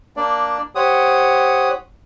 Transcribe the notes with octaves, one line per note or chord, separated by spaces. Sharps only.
A#3 D4 D5
G4 C5 C#5 F#5 D#6